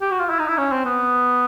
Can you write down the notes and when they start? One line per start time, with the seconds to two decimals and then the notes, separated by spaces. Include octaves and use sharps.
0.01 G4
0.11 F#4
0.20 F4
0.30 E4
0.39 D#4
0.48 E4
0.58 C#4
0.72 C4
0.86 B3